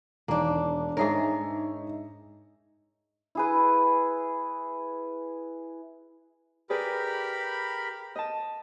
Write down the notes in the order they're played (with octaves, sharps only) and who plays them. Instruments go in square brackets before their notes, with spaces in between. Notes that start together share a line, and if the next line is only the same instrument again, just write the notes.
[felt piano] E1 D#3 [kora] A#3 D4
[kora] G#2 G#4 A#4 [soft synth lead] D#4 [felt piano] C#5 E5
[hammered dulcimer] E4 G#4 B4
[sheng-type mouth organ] G4 A#4 B5 [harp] G#4 B4 D5
[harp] D#5 A5